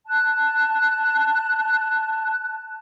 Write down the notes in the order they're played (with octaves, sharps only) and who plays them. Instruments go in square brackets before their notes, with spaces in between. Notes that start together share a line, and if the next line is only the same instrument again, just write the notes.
[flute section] A5 F#6